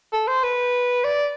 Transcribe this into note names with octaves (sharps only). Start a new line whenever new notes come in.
A4
C5
B4
D5